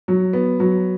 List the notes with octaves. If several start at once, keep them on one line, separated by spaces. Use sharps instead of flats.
F#3
B3
F#3